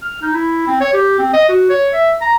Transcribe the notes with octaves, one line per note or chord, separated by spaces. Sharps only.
F6
D#4
E4
C4
C#5
G4
C4
D#5
F#4
C#5
E5
A#5